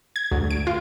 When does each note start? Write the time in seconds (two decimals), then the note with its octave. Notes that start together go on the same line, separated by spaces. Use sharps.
0.16 G#6
0.31 D2
0.50 D7
0.67 F4